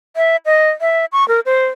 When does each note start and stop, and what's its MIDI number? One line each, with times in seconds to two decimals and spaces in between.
0.16 0.36 76
0.46 0.70 75
0.81 1.05 76
1.12 1.27 85
1.28 1.40 70
1.46 1.66 72